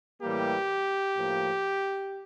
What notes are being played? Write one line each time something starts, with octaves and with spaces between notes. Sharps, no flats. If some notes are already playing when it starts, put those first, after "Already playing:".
A2 E3 G3 A#3 G4
A2 F3 A#3